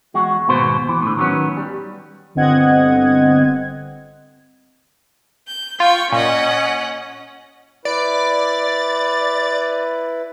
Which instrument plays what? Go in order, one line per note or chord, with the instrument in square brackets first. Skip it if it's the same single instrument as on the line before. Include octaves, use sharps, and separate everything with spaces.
[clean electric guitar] E2 G#3 F#4
D#2 G#2 B2 B3 C5
E3
A2 D3
D#3 F#3 A3 B3 C#4
G3
[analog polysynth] G1 D3 C4 D#5 F#5 G#6
[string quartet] G6
[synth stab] F4 [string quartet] G5 C#6
[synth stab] A#2 [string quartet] C#4 D#5 F#5
[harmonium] E4 B4 [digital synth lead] D5